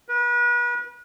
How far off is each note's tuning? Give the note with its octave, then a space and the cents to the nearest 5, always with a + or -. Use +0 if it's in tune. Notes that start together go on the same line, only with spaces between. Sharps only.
B4 -35